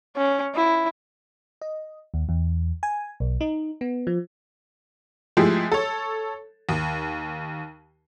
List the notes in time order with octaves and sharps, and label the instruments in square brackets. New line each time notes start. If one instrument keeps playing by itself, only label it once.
[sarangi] C#4
E4
[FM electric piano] D#5
D#2
E2
G#5
B1
D#4
B3
F3
[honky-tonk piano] F3 G#3 A3 E4 G4 G#4
A4 C#5
D#2